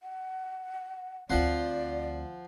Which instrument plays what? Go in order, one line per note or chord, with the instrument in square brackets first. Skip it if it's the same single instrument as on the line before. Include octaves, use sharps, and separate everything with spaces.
[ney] F#5
[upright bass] D2 C4 [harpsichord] F3 F#5 C6 [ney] D5